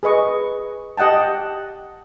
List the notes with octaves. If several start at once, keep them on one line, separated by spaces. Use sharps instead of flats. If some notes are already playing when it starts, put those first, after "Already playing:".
G#4 B4 D#5 C#6
G4 D#5 F#5 G5 A5